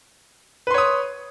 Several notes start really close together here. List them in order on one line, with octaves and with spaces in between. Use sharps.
B4 C6 C#5 D#6